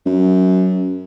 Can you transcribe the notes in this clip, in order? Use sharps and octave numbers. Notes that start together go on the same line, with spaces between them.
F#2